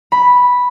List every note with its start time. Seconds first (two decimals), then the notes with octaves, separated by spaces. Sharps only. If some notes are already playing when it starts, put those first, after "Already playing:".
0.12 B5